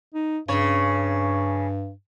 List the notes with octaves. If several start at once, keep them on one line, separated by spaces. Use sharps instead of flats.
D#4
G2 C#3 C#5